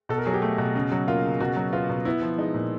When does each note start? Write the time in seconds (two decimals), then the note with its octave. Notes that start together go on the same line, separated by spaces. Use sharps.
0.09 B2 A4
0.18 A#4
0.26 F#3 G#4
0.34 G4
0.42 A3
0.58 B2
0.75 C#3
0.92 F#3
1.07 A#3 F4
1.24 C#3
1.40 B2 F#4
1.57 F#3
1.73 B3 F4
1.89 B2
2.05 B3 E4
2.22 F3
2.38 G#3 D#4
2.54 A#2